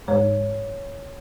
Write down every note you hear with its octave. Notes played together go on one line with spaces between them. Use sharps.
G#2 C#5